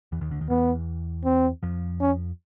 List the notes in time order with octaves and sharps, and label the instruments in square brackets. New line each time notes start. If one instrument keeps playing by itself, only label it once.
[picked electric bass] E2 E3
D#2 D#3
D2 D3
D#2 D#3
[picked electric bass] E2 E3 [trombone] B3
[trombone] C4
[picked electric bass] F2 F3
[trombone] C#4